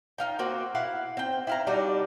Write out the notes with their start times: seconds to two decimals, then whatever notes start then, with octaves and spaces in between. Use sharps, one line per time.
0.18 D#4 F4 G5
0.39 A#3 C4 F#4
0.75 E4 F5 F#5
1.17 C4 G5
1.47 E4 F5 A#5
1.67 G3 D4 D#4 F#4